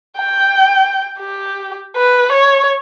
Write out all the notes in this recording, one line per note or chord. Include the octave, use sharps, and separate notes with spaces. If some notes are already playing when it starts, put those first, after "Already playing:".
G5
G4
B4
C#5